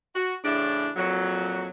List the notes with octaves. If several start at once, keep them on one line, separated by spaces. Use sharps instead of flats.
F#4
A2 C#3 E3 D4
F2 A#2 F#3